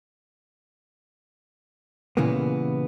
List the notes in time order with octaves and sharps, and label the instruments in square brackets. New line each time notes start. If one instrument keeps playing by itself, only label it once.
[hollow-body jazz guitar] A#2 C#3 E3 G3 A#3 B3